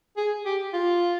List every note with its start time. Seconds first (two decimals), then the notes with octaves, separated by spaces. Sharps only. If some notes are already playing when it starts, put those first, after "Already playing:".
0.17 G#4
0.46 G4
0.74 F4